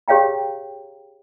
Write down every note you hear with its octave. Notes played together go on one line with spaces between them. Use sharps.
G4 G#4 C#5 F5 G5 A#5